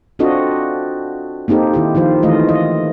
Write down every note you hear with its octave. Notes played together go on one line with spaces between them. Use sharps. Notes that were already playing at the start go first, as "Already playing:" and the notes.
C4 D4 F4 F#4 A4 D#5
A#3 C4 D#4 G4 A4
D#3 E4 G4
D#3 F3 F4 C5
D#3 E3 A3 F4 D#5
D#5